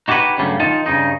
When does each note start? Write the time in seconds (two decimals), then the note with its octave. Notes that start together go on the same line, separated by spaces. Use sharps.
0.08 D#4 F#4 G4 A4 B4 C#5
0.38 G2 C#3 F#3 G3 A3
0.60 D#3 D#4 F4 A5
0.86 G2 C#3 D#4